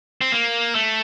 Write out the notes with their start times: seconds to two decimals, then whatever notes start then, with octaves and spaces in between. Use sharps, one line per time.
0.21 C4
0.32 A#3
0.75 A3